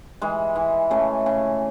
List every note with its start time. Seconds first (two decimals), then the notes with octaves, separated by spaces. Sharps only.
0.22 E3 G#3
0.56 E3
0.91 C#3 A3
1.26 C#3